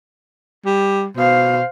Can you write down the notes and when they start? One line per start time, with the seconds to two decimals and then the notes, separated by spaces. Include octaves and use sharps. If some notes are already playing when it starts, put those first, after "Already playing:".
0.65 G3
1.17 B2 C5 F5